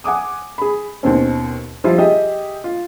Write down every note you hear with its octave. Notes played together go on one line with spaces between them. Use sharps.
F#5 G#5 D6 D#6
G#4 B5
D#2 B2 C4 C#4
F3 G3 E4 F4
G4 G#4 D#5 E5
F4